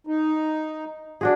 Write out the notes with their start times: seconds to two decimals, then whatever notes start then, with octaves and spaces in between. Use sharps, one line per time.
0.07 D#4
1.21 D4 F#4 G#4